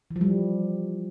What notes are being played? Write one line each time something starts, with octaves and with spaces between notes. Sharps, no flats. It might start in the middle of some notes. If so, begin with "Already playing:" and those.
E3
F3
G3